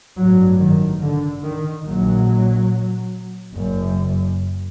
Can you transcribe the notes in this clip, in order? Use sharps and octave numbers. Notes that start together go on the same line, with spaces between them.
A1 G2 F#3
D#3
D3
D#3
A#1 A#2 F#3
F#1 F#2